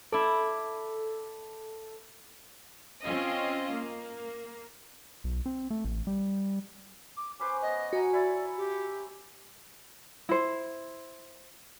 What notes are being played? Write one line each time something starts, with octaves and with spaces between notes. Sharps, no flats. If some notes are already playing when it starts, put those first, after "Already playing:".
E4 A4 D5
C4 C#4 F4 D#5
A#3
B1
C4
A3
A1
G3
D6
C#4 B4 C5 D6
B3 C#5 D#5
F#4 G#5 A#5
E4 D5
G4
E4 C5